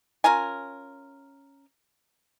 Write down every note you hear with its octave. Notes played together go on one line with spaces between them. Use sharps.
C#4 F4 A#4 G#5